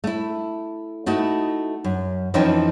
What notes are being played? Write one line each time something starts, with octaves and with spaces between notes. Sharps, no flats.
A3 E4
A3 D#4 E4 F#4
F#2
F2 E3 F3 C#4 D#4 G5